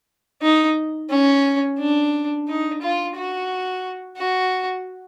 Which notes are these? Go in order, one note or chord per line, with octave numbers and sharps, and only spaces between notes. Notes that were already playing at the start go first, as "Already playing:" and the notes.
D#4
C#4
D4
D#4
F4
F#4
F#4